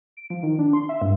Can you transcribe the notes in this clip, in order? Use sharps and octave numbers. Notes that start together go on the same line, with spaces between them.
D7
F3
D#3
D4
C6
E5
G2